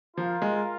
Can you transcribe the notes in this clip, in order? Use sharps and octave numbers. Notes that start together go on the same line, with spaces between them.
F3 F4 A#4 F5
G#3